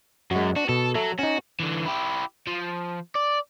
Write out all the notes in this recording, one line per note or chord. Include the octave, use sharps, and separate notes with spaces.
F#2 G#3 F#4
D4 F#4
B2 A4
F#3 A4 E5
C#4 D#4 F#4
D3 E3
E4 G4
F3
D5